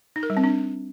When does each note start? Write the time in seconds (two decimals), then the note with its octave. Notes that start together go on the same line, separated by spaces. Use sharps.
0.16 D#4
0.23 A#4
0.30 G3
0.37 C4
0.44 D4